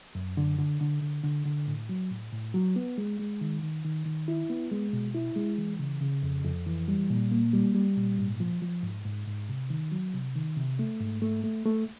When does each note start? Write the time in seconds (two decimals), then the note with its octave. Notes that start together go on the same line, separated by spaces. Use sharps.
0.15 F#2
0.37 D3
0.59 D3
0.81 D3
1.02 D3
1.24 D3
1.46 D3
1.67 A2
1.89 F#3
2.11 A2
2.33 A2
2.54 F#3
2.76 B3
2.98 G#3
3.20 G#3
3.41 D#3
3.63 D#3
3.85 D#3
4.06 D#3
4.28 E4
4.50 B3
4.71 G#3
4.93 B2
5.15 E4
5.36 G#3
5.58 E3
5.79 C#3
6.01 C#3
6.23 F2
6.45 F2
6.67 E3
6.88 G3
7.10 A#2
7.32 A#3
7.53 G3
7.75 G3
7.96 A#2
8.19 G#2
8.40 F3
8.62 F3
8.83 G#2
9.05 G#2
9.27 G#2
9.49 C3
9.70 D#3
9.92 F#3
10.14 C3
10.35 D#3
10.57 C3
10.79 A3
11.00 G#2
11.22 A3
11.44 A3
11.66 A3